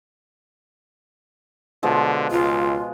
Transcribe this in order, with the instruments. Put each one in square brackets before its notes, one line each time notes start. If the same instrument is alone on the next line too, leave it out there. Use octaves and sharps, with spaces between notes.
[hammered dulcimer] B2 F3 G#3 [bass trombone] D3
[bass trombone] C#2 [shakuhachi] F4